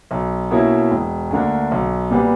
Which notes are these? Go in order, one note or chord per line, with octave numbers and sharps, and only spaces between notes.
B1
B2 A#3 C#4 E4
E1
D2 D3 A#3 D4
B1
A#2 G3 B3